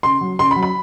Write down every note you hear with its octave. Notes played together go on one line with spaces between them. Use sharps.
C#3 C6
F#3
C#3 C6
B5
F#3
B5